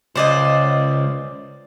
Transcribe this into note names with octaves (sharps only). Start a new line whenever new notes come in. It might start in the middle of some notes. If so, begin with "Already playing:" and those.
C#2 C5 D5 D#5